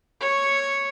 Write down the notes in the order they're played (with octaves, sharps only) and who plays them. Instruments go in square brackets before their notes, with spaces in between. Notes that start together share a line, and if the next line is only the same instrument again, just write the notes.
[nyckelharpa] C#5 C#6